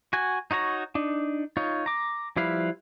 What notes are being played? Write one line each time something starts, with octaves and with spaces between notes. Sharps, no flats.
F#4 G#5
D#4 F#4 C#5 A#5
D4 D#4
D#4 F4 C#5
A#5 D6
F3 G3 E4 B4 F5